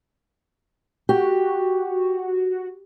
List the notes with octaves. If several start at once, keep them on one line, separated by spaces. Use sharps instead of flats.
F#4 G4